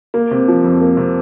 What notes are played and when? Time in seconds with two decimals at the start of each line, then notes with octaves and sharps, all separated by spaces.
0.14 A#3
0.31 C3
0.48 F3
0.64 F2
0.81 A#3
0.97 C3